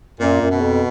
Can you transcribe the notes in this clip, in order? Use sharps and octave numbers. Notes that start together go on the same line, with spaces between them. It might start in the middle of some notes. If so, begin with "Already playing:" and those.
F#2 A#2
F#2
B2
F2